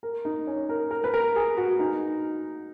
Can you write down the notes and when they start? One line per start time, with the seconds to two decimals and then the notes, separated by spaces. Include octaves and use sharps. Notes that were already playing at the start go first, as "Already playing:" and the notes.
0.03 A#4
0.25 D#4
0.47 C#4
0.69 A#4
0.91 A#4
1.04 B4
1.14 A#4
1.36 G#4
1.57 F#4
1.79 D#4